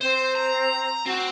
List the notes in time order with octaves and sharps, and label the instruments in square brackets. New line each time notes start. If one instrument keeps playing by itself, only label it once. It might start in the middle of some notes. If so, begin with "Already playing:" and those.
[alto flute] C4 [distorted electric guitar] C5
[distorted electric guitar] A#5
[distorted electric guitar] C4 [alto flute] F#4